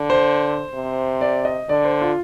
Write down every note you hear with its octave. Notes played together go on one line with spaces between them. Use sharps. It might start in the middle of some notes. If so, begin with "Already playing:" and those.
Already playing: D3
C5
C3
D5
D#5
D3 D5
C5
F4